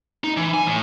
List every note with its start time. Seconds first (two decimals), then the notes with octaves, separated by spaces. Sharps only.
0.24 D#4
0.37 E3
0.54 G#5
0.67 A2